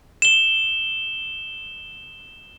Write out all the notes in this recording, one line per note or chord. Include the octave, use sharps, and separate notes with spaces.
E7 G7